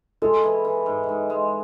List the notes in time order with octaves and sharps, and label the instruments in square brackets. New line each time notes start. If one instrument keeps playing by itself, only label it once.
[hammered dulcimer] G#3 [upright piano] A4
[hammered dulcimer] E3
E3
G#2
G#2
G#3